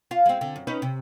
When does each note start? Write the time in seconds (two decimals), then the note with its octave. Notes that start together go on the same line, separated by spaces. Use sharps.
0.11 F4 F5
0.26 G#3 C4
0.41 D3
0.56 F#2
0.67 C#4 D#4 B4
0.82 C3